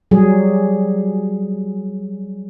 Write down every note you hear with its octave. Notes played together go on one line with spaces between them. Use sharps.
F#3 G3 G#4